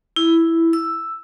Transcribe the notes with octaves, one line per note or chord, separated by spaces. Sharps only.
E4
E6